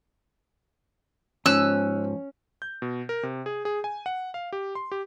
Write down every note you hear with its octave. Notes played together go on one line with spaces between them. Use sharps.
G#2 F3 C#4 E6 F#6
G6
B2
A#4
C3
G#4
G#4
G#5
F#5
F5
G4
C6
G4